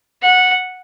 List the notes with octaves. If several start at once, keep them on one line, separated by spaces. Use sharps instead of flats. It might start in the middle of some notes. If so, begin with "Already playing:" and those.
F#5